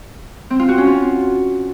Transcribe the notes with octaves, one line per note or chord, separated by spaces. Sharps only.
C4
F4
F#4
C#4
F4